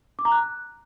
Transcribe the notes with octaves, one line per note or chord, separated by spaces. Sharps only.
D6
A#5
F#6